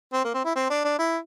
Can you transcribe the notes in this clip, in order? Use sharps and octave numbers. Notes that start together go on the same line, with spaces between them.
C4
A#3
C4
E4
C4
D4
D4
E4